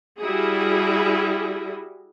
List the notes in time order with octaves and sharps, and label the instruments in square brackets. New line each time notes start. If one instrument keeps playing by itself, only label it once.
[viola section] G3 E4 F#4 G#4